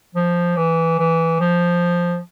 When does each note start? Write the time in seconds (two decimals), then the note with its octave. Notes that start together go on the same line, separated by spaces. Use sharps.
0.15 F3
0.56 E3
0.99 E3
1.40 F3